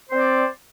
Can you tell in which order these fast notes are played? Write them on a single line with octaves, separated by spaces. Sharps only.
C5 C4 D5